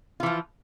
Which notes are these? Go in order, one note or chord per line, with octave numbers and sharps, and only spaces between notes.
E3 F3 F4